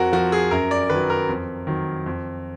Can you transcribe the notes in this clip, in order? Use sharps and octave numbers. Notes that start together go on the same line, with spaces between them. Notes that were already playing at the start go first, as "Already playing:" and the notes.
Already playing: F2 F#4 A#4
F3 F#4
G#4
F#2 A#4
D5
D#3 B4
F#3
A#4
F2
D#3 F#3
F2